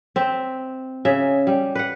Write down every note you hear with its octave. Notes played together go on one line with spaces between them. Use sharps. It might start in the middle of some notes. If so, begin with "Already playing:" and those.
C4 E5
C#3 G#4 E5
G3
B4 F#5